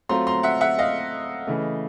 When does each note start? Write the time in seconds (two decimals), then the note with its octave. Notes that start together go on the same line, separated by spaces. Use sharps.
0.09 F#3 A3 C4 F4 A#5 C6
0.27 A#5 C6
0.43 E5 F#5
0.61 E5 F#5
0.79 D#5 F5
1.47 C#3 E3 A3